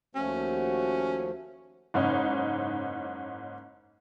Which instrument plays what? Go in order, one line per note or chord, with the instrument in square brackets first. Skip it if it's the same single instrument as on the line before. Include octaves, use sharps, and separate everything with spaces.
[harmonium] D#2 F3 A3 [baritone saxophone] C#4 [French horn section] F#4
[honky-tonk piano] F#1 G#2 C#4 D#4